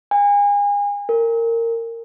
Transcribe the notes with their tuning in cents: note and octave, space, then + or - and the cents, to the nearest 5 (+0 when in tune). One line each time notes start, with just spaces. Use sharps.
G#5 -35
A#4 -20